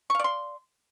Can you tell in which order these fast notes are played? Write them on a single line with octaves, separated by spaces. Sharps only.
C#6 F5 D5 C6